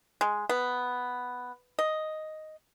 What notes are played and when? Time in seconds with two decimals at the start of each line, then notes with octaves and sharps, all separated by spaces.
0.21 G#3
0.49 B3
1.79 D#5